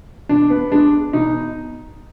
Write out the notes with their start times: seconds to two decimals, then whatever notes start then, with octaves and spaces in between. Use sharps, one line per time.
0.29 B2 D4
0.50 B3
0.72 G#3 D4
1.13 B2 D#4